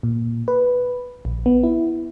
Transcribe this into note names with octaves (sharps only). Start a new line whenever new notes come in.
A#2
B4
A#1
B3
E4